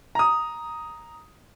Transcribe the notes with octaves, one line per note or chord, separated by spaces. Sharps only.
A#5 D#6